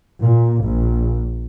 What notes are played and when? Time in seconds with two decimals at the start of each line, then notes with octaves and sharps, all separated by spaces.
0.22 A#2
0.63 A#1